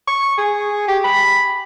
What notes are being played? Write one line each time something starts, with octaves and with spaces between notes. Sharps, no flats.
C#6
G#4
G4
B5